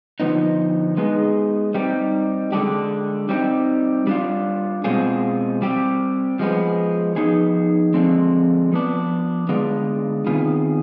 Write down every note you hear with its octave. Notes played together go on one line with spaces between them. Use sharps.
D3 F3 B3 D#4
G#3 B3 D#4 G#4
G3 C4 D#4 G4
D3 G#3 D4 G4
G3 C4 D#4 G4
G3 D4 F4
B2 G#3 C4 F4 G#4
G3 C4 G4
F3 G#3 B3
F3 B3 D#4 G#4
D3 F3 G#3 C4
F3 B3 D4
D3 G#3 B3 D4 F4
C3 D#3 B3 F4 G#4